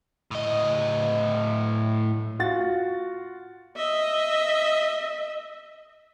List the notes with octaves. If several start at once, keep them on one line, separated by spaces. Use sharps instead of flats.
A2 D#5
F4 F#4 A6
D#5 E5